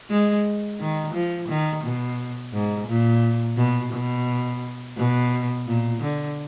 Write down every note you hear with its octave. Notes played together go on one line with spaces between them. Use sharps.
G#3
D#3
F3
D#3
B2
G#2
A#2
B2
B2
B2
A#2
D3